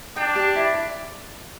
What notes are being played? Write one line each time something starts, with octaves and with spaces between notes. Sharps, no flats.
D4 G5
G4
E4
D5